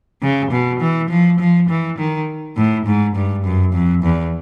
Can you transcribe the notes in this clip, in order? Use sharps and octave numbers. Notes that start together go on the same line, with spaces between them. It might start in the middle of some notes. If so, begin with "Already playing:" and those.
C#3
B2
E3
F3
F3
E3
D#3
A2
G#2
G2
F#2
F2
E2